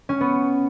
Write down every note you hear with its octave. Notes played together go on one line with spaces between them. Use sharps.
C#4
B3